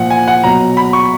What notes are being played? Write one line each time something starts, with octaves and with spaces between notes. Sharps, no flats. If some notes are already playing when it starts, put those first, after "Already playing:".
Already playing: A#2 F3 F#5
G#5
F#5
B2 F#3 A#5
B5
C#6